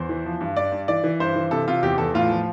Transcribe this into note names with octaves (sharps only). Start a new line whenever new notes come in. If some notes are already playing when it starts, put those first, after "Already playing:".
Already playing: E2 C5
E3
F3
G2
G2 D5
G2
E3 D5
E3
G2 C5
E3
C3 A4
C3 F4
E2 G4
E2 A4
A2 F4
F3